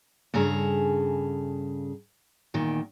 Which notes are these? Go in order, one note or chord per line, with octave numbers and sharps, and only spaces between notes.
G2 C#3 G#4 A4 A#5
E2 A#2 D#3